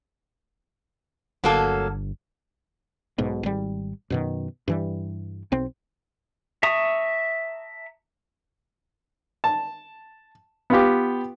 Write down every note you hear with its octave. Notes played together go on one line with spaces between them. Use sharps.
G1 F#3 A#3 A4
B1 G#2 B2
G#1 G3
F#2 B2 D#3
G2 E3 G3
B1 C4
E5 A5 A#5 C#6 D#6
A5
B3 F4 G4